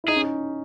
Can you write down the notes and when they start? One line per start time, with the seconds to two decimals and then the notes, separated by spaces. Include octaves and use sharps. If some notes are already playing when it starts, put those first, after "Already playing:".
0.04 E4
0.08 D#4 G#4
0.16 C#4